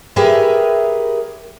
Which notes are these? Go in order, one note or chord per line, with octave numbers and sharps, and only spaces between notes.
G4 G#4 A#4 B4 C#5 E5